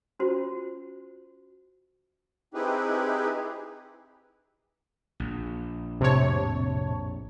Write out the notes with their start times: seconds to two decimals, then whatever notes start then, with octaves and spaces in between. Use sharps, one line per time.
0.19 C#4 F4 F#4 C5
2.54 C4 D#4 E4 G4 G#4 B4
5.20 A#1
6.01 F2 A2 C3 C#5 A5